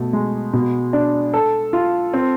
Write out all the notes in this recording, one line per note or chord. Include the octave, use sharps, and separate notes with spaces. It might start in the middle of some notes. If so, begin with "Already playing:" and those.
Already playing: B2 A3
G#3
B2
D4
A4
F4
C4